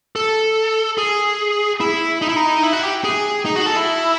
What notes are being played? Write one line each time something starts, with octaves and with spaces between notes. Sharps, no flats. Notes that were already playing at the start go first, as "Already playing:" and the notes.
A4
G#4
E4
D#4
E4
D#4
E4
F#4
G4
G#4
D#4
F#4
A4
E4